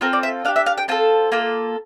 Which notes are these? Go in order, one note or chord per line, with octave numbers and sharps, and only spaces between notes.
C4 F4 A4 A#4
D5
E5
D4 G4 F5
E5
F5
G5
C4 F4 A4 A5
A#3 F4 A4